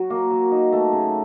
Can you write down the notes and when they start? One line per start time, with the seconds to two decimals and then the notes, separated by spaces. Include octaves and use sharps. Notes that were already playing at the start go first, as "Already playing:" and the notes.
Already playing: F#3 F#4
0.10 A#3
0.31 F#3
0.52 D#4
0.72 A3
0.93 C#3